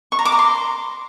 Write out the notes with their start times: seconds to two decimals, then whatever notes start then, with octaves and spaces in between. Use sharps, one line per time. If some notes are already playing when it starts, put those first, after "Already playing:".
0.12 C#6
0.19 A#5
0.25 D6
0.32 A#5
0.39 C6